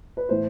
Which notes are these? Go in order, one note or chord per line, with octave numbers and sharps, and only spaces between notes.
B4
A2 E3 C5